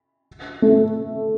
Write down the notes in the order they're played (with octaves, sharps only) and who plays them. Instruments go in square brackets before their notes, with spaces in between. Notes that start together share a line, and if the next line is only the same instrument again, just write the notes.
[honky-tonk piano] A3